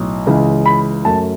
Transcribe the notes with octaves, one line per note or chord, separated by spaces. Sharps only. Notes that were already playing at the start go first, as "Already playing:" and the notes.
Already playing: B1 A2
C#2 C#3 E3
B5
F#2 F#3 A3 A5